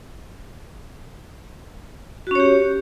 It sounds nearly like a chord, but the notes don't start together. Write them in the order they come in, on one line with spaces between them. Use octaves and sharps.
F#4 C#4 C#5 G4